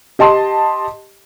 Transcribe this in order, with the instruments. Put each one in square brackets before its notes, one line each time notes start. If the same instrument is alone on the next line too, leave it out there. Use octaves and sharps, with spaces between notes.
[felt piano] G4 D#5 A5 C6